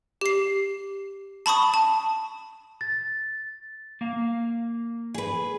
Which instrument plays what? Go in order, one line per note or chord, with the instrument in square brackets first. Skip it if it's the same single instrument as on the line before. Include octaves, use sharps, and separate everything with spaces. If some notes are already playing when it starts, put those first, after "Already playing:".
[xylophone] G4 C7
A5 B5 C#6 D#6
A5
[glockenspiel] A6
[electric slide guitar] A#3 F5
[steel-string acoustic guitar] G#4 B4